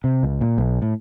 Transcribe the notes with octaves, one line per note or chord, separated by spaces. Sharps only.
C3
C#2
A#2
B1
A2